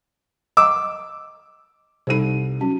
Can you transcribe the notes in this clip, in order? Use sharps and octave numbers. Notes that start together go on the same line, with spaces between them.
D#5 F#5 A#5 D6 E6
C2 D#4 A4 C5 D#7
F#3 C#4